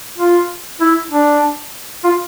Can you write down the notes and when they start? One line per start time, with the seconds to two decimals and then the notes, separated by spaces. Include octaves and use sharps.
0.17 F4
0.81 E4
1.11 D4
2.04 F4